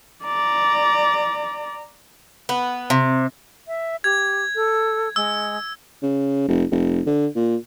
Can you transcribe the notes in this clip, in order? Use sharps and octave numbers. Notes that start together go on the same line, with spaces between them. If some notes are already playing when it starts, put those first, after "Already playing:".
D5 A#5
B3
C3
E5
G4 G#6
A4
G#3 E6
C#3
F1
F1
D3
A#2